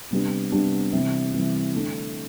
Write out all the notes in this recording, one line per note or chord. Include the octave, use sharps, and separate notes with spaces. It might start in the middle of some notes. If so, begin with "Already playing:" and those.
C3 G3 B3 D4 G4
C3 G3 B3 D4 G4
C3 E3 G3
C3 E3 G3
D3 A3 D4